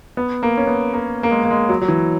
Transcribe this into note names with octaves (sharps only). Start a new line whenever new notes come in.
B3
A#3
C#4
B3
A#3
A#3
G#3
A#3
G#3
F#3
F#3
E3